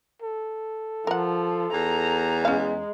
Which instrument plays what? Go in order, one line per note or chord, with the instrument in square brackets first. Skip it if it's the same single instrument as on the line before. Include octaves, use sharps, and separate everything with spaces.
[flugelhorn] A4
[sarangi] F3 [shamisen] A#4 F#5
[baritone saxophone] E2 [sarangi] A#5
[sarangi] G#3 [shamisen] C#4 F5